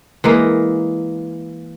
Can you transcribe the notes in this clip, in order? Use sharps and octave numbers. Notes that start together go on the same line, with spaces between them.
E3 G#3 A#3